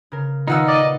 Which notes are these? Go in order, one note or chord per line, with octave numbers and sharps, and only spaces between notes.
C#3 A#4
A#2 D#3 B3 D#4 F4 F#5 E6
D5 D#5